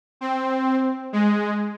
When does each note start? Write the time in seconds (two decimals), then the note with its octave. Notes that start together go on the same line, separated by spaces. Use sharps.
0.21 C4
1.13 G#3